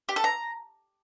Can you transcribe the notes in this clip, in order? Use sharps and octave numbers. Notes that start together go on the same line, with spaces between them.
G4
A4
A#5